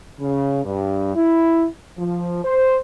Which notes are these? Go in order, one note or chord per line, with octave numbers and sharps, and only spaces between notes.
C#3
G2
E4
F3
C5